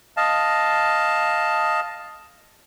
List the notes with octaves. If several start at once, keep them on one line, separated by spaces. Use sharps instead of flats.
D#5 F5 A5